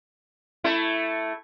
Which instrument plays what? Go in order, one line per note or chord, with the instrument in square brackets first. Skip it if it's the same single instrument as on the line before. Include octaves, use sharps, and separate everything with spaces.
[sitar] A3 E4